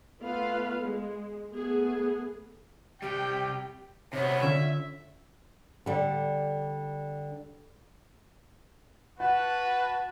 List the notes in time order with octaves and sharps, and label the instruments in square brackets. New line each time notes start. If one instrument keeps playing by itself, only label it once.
[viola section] A3 B3 F4 A4 B4 F5
G#3
A3 B3 G#4
[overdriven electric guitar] C3 G3 [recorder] G4 [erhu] G5
[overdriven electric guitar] C3 B3 [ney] C#5
[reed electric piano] D3 C#4 F4 [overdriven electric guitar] E5
[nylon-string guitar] D3 G3
[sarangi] F#4 [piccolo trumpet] B4 [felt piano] F#5 [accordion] A5